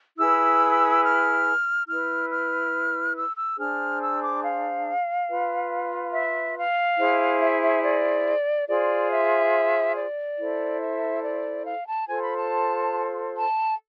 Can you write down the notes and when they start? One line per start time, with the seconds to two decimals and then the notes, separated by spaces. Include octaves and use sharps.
0.16 E4 G#4 B4 E6
1.02 F6
1.86 E4 B4 F6
2.30 F6
3.14 E6
3.36 E6
3.57 D4 G#4 C5 F6
4.00 E6
4.21 D6
4.43 F5
5.27 F4 B4
6.12 E5
6.56 F5
6.98 E4 G#4 C5
7.40 E5
7.61 E5
7.83 D5
8.68 F4 G#4 C5 D5
9.11 E5
9.96 D5
10.38 E4 A4 C5
10.81 E5
11.23 D5
11.66 F5
11.87 A5
12.08 F4 A4 C5 G#5
12.22 B5
12.37 A5
13.36 A5